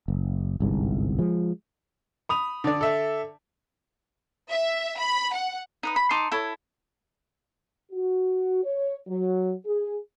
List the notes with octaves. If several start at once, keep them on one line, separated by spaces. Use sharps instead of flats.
F#1
G1 C2 G#2
F3 G#3
B5 D#6 F7
D3 D5
A4 E5
E5
B5
F#5
D#4 B4 D#6
B5
D#4 A5 C6 D6
E4 A4 C#5
F#4
C#5
F#3
G#4